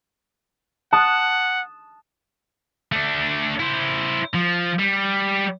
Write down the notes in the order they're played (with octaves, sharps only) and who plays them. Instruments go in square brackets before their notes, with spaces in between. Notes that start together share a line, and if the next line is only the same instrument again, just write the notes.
[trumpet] F#5 [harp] A5 D#6 F#6
[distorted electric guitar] A3 D4
E4 C5
F3
G3